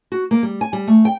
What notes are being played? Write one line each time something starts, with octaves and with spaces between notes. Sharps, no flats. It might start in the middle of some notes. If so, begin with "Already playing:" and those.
F#4
A#3
G3
G#5
G3
A3
G5